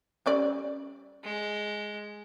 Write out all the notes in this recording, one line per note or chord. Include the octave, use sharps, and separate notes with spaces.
G3 C#4 D5
G#3